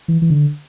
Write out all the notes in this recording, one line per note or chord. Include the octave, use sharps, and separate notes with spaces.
E3
E3
D3